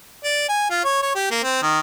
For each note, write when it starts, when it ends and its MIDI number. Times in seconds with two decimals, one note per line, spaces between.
0.24 0.47 74
0.49 0.66 80
0.71 0.83 65
0.85 1.00 73
1.02 1.15 73
1.16 1.29 67
1.31 1.41 58
1.43 1.61 60
1.62 1.79 51